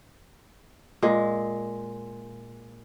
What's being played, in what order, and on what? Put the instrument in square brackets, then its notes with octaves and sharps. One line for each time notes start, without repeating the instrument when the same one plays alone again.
[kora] A#2 G#3